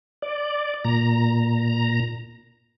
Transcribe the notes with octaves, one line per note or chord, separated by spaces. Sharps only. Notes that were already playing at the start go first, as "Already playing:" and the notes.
D5
A#2 A#5